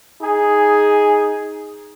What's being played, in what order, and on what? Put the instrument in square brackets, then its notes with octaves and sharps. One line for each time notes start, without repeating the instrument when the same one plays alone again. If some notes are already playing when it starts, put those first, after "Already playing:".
[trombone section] D#4 G#4